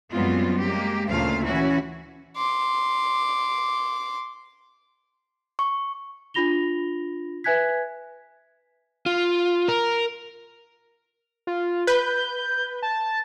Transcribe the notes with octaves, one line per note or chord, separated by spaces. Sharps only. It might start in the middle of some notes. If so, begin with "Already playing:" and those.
F#2 G3 G#3 B3 C4 F4
G#3 A#3 G4
D2 A#2 C#3 A3 F4 F5
E3 C#4 E4 F#4
C6 D6
C#6
D4 F4 B5 A#6 F7 G7
B4 E5 G#5 F#6 G#6 B6
F4
A#4
F4
B4 G6
A5